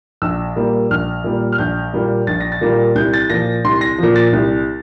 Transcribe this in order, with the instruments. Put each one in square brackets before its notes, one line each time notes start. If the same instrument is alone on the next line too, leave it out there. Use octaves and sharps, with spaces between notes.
[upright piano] A#1 E6
A#2 G3 A#3
A#1 F6
A#2 G3 A#3
F6
A#1 G6
A#2 G3 A#3
A#1 A6
A#6
A6
A#2 G3 A#3
C2 G6
A6
A#2 F3 A#6
C2 C6
A#6
A#2 F3
A6
C2